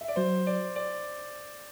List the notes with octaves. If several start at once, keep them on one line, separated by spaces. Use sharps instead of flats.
E5
D5
F#3 C5
D5
D5